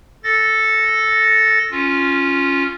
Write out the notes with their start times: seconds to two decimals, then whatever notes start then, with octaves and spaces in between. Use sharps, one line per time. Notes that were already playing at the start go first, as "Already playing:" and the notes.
0.24 A4 A6 A#6
1.71 C#4 F4